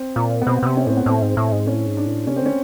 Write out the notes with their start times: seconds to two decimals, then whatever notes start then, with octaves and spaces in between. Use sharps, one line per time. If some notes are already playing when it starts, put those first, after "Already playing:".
Already playing: C4
0.16 A#2
0.42 B3
0.47 B2 C4
0.62 B2
0.66 C3
0.77 C#4
0.87 A2 C4
0.97 B3
1.06 A2 C4
1.22 G#2
1.37 A2
1.52 G#2
1.67 A2 C#4
1.87 G#2
1.97 D4
2.07 A2
2.27 C3 C#4
2.36 C4
2.42 D3 C#4